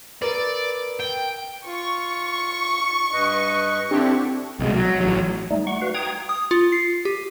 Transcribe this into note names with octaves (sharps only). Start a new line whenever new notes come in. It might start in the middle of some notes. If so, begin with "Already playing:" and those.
A#4 B4 D5
G5
F4 C#6
G2 B4 D#5
D3 C4 D4 E4 G4
C2 B2 G3 G#3
F#3
A1 F#3
G3 A3 D#4
F#5 C#6
F#4 B4 F5
G5 A#5 D#6 G#6
D#6
F4
C7
G4